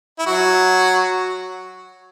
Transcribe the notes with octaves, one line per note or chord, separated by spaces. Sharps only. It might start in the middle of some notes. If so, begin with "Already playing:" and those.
E4
F#3 F#4